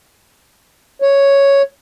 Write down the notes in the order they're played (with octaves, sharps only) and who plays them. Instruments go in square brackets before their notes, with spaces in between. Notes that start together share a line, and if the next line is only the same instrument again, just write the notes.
[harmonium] C#5